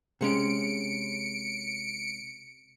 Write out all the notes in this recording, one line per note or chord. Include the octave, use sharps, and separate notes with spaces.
C3 G#3 C#4 C#7 D7